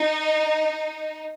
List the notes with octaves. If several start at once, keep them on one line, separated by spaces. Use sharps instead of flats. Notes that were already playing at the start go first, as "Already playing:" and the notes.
Already playing: D#4